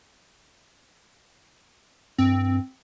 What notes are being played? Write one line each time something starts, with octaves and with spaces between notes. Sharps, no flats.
G2 C4